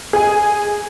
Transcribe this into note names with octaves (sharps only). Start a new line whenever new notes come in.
G#4 G#5